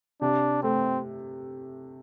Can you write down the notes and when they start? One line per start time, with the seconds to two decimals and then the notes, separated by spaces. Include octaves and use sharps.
0.21 C3 D4
0.63 A3 C4